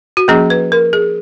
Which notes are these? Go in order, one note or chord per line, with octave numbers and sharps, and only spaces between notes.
F#4
F3 A#3 C#4 G#4
B4
A#4
G#4